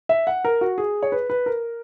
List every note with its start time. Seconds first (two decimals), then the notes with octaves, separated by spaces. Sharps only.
0.09 E5
0.27 F#5
0.45 A#4
0.61 F#4
0.78 G#4
1.03 C#5
1.12 B4
1.30 B4
1.46 A#4